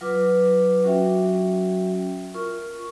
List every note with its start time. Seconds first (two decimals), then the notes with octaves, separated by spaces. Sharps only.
0.01 F#3 F4 B4 D6
0.84 F#3 C#4 F#4 E5 G5
2.35 F4 A#4 C#6